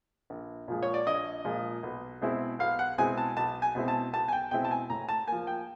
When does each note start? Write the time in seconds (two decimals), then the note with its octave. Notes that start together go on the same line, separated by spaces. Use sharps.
0.30 A#1
0.68 A#2 F3 G#3
0.83 C#5
0.94 D5
1.07 A#1 D#5
1.45 A#2 F3 G#3
1.83 B1
2.21 B2 G#3 C4 E4
2.59 B1 F5
2.79 F#5
2.98 B2 G#3 C4 E4 G#5
3.17 A5
3.37 B1 A5
3.62 G#5
3.75 B2 G#3 C4 E4
3.88 A5
4.13 B1 A5
4.28 G#5
4.33 G5
4.51 B2 G#3 C4 E4 G5
4.65 A5
4.71 G#5
4.90 A2 A#5
5.09 A5
5.28 F3 A#3 G#5
5.47 G5